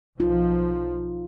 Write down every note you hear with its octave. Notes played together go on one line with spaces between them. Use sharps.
B1 F3 D#4 F4